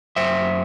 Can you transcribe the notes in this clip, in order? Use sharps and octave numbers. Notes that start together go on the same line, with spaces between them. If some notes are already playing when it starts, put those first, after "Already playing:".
F#2 C5 E5